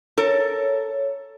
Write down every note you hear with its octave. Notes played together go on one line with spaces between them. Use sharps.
A4 A#4 C#5